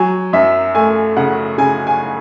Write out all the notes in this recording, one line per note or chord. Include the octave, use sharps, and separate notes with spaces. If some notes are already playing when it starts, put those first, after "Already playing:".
Already playing: F#3 G#5
F#2 E5
A3 G#5
C#3 F#5
C#3 G#5
G#5